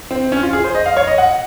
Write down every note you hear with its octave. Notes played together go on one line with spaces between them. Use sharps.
C4
C#4
F4
G#4
C5
D#5
F5
C#5
D#5
F#5